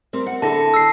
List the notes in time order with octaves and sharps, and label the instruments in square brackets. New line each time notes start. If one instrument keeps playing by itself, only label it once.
[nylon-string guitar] G3 C4 A#4
F#5
[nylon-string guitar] D3 E4 A4 [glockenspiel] A5 A#6
[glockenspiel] E6 C7